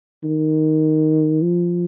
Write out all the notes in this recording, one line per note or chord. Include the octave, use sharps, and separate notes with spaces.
D#3
F3